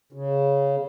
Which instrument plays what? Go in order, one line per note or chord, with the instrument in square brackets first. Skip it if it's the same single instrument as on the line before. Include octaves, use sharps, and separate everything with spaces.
[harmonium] C#3